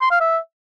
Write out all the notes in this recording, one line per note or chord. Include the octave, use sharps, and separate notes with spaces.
C6
F5
E5